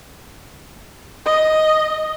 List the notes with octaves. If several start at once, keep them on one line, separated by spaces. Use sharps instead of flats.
D#5